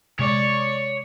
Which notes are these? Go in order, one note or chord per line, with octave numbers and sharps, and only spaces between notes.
C3 G#3 C#5 D5 C#6